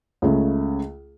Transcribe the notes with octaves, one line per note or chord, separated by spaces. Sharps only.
C#2 C#3 A3